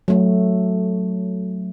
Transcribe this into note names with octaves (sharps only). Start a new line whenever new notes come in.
F#3 A3